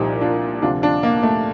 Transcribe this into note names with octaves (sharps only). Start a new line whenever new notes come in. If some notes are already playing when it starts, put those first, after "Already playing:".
Already playing: C2 A#2 F3 D#4 G4
D4 F4
D2 C3 F3 D4 F4
D4 F4
A#3
A3